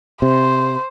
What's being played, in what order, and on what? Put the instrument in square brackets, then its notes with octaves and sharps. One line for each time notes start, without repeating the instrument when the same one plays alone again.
[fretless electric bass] C3 [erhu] C5